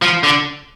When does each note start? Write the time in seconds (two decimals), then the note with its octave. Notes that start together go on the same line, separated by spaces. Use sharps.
0.02 F3
0.23 D3